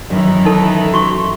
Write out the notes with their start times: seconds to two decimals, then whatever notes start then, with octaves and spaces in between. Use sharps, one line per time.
0.10 F#2 D#3 E3 E4
0.45 D#4 A4
0.94 F#4 C#6